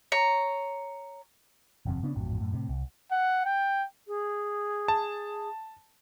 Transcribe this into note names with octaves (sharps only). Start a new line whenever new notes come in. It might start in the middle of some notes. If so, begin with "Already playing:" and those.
C#5 A#5
G1 F2 C3
C#3 B3 C#4 D4
A1 F2 G#2 B2
F#2 A2
A2 C3
C2
F#5
G5
G#4
A5